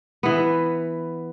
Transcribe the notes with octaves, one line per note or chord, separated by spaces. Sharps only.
E3 B3